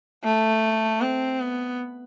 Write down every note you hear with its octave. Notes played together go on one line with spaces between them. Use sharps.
A3
C4
B3